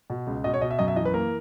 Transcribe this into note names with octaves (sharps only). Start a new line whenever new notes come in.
B2
C#2
B2 D#5
C#5
B2 D#5
E5
F#2 D#5
E5
E3 D#5
B4
A#3 A#4